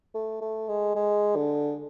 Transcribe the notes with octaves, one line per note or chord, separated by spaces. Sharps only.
A3
A3
G#3
G#3
D3